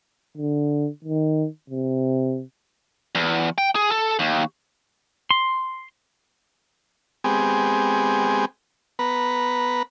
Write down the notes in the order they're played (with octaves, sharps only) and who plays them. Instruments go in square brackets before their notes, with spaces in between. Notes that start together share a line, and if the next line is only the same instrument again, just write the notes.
[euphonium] D3
D#3
C3
[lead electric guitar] E2
G5
G#4
A4
D#2
[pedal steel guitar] C6
[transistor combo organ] G#3 B3 C4 G4 G#4
B3 B4 A#5